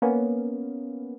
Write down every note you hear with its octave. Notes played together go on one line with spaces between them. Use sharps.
A#3 B3 C#4